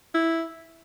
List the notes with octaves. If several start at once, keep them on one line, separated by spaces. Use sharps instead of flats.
E4